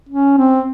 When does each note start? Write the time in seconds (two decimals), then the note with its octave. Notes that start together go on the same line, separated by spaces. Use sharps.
0.09 C#4
0.38 C4